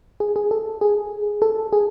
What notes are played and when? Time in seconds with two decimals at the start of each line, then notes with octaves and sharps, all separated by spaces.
0.20 G#4
0.36 G#4
0.51 A4
0.81 G#4
1.42 A4
1.73 G#4